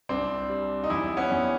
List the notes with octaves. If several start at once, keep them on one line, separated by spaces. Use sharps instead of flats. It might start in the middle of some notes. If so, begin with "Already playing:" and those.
C2 C4 D4
G3
D#4
E2 D4 E4
B3 C#4
E2